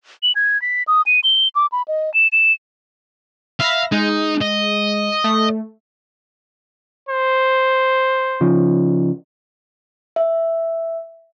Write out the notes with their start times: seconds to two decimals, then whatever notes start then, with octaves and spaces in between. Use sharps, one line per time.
0.23 F#7
0.35 G#6
0.62 B6
0.88 D#6
1.06 D#7
1.24 G7
1.55 D6
1.72 B5
1.88 D#5
2.14 E7
2.32 E7
3.60 E5 F5 B5 A#6
3.92 G#3 D#4
4.41 D#5
5.24 A3
7.09 C5
8.41 C#3 F3
10.16 E5